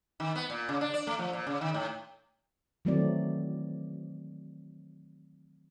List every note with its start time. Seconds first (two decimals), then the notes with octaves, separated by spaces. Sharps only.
0.20 D#3
0.36 B3
0.50 A#2
0.69 C#3
0.81 D4
0.94 D5
1.07 A3
1.19 F3
1.33 A#2
1.47 C#3
1.61 D#3
1.74 A2
2.85 D#3 E3 F#3 A3 C4 D5